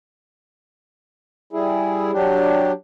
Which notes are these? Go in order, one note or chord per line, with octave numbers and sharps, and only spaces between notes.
G3 E4 G#4
F#3 D4 G4